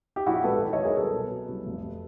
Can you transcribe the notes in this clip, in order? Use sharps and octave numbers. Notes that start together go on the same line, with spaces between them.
G4
A#1 E4 F#4
G#2 A4 B4
D#3
C#5 D#5
F#3
G#4 A#4
C2 A4 B4
B2
F#3
C2
F1